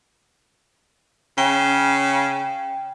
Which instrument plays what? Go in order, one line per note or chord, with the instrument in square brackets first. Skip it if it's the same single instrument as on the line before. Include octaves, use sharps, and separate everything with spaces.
[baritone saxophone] C#3 [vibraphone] G5